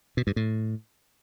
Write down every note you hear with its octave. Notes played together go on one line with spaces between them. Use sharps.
B2
G2
A2